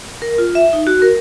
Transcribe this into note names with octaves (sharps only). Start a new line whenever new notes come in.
A#4
F4
E5
D#4
F#4
A#4